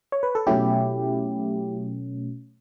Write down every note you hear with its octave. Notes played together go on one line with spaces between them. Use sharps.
C#5
B4
A4
B2 F#3 A3 C#4 E4 G4